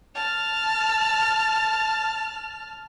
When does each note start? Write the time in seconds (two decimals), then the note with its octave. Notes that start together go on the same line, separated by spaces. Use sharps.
0.15 A5 F6